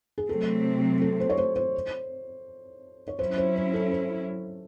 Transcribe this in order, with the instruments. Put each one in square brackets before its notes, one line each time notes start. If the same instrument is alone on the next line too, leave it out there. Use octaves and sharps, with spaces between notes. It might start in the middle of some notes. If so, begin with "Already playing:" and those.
[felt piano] G#4
[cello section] C3 F#3 A3 C4 [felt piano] A4
[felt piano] A4
C5
C#5
C5
C5
C#5
[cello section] F#3 C#4 E4 [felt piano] C5
[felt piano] C5
C5
A4
C5